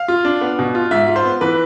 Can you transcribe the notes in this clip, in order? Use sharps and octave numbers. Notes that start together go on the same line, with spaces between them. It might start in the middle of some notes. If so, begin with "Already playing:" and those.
Already playing: F5
F4
D4
B3
B2
F4
G#2 E5
F4
C5
B3
E3 B4